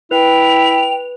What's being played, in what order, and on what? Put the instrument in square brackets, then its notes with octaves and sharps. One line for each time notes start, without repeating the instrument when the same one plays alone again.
[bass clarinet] E4 [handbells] B4 [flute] G5 [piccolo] F7